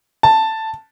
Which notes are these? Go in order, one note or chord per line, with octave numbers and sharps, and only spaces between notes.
A5